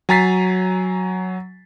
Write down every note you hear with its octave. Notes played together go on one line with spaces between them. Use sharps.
F#3 G#5 A#5 A6 B6 C7